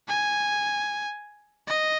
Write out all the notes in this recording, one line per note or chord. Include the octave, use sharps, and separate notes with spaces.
G#5
D#5